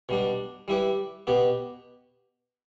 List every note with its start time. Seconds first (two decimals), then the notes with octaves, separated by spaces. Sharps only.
0.09 B2 G3 D4
0.68 G3 E4 G4 B4
1.27 B2 B3 G4